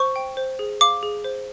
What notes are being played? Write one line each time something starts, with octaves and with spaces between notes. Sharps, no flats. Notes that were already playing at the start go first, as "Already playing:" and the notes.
Already playing: C5 C#6
G5
C5
G#4
F5 D6
G#4
C5